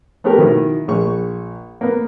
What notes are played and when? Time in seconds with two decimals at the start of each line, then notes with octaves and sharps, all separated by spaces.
0.24 A3 B3 C4 G4 A#4
0.38 B2 D#3 B3 E4
0.88 A#1 C#6
1.81 A#3 B3